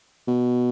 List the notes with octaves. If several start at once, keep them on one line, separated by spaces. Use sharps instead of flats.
B2